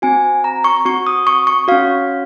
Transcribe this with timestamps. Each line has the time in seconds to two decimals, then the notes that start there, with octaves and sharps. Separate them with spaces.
0.02 C4 F#4 G#5
0.44 A#5
0.64 C#6
0.85 C4 F#4 C#6
1.07 D#6
1.27 C#6
1.47 C#6
1.68 C#4 F#4 F5